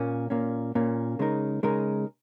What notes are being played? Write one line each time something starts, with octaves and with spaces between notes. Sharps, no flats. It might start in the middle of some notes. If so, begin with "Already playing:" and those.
Already playing: A#2 A#3 C#4
A#2 A#3 C#4
A#2 A#3 C#4
C#3 G#3 D#4 A#4
C#3 G#3 D#4 A#4